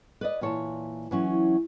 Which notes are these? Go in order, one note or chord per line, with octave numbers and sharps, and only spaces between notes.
B4 D5 D#5
A#2 E3 C#5 G#5 A5
E3 F#3 C#4